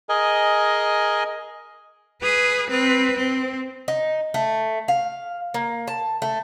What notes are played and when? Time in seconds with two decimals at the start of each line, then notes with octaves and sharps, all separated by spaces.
0.09 G#4 A#4 D#5 G#5
2.21 G#4 B4
2.71 C4 B4
3.17 C4
3.88 D#4
4.34 A3
4.88 F5
5.54 A#3
5.88 A5
6.22 A3